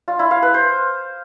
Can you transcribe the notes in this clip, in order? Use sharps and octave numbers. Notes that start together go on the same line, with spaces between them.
F4
E4
F5
B4
C5